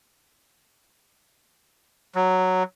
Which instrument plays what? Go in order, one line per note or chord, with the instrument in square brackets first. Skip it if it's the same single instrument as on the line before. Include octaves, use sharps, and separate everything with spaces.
[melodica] F#3